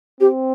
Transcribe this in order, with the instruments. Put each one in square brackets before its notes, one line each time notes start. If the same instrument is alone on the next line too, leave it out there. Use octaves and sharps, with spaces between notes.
[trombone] C4 [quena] G4